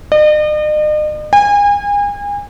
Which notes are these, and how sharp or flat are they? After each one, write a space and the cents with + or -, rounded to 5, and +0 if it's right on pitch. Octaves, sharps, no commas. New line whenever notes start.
D#5 -45
G#5 -35